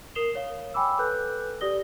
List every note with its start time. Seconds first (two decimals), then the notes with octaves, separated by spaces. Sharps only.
0.15 A#4 D#6 C7 E7 F7 G7
0.35 C#5 F5
0.74 G5 G#5 B5 D6 E6
0.99 A4 B4 F#6 G6
1.61 G4 D5 D#6 A#6 G7